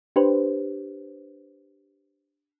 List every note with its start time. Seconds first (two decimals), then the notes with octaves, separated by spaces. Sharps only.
0.16 D4 G4 B4 C5